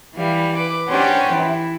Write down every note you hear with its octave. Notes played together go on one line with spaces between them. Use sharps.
E3 G3 F5
B4 D6
C#4 D4 G4 B4 C5 F#5
E3 E4